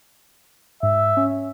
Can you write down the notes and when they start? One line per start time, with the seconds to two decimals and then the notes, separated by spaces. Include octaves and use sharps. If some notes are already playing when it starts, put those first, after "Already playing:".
0.83 G#2 E5
1.17 C#4